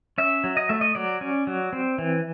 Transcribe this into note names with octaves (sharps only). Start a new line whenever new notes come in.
C#4 E5
F#3
D#5
A3 E5
D#5
F#3 D5
C#4
F#3
C4
E3